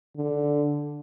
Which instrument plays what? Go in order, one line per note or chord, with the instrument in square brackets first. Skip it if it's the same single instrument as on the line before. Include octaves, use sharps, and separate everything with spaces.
[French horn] D3